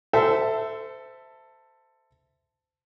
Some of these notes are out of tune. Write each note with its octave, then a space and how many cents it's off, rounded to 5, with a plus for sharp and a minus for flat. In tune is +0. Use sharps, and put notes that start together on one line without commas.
A4 +10 C5 -25 E5 +0